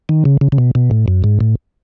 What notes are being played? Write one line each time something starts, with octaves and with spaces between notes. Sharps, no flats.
D#3
C#3
C#3
C#3
B2
B2
A2
F#2
G#2
A2